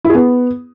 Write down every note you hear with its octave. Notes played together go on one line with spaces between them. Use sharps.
E4
G#4
B3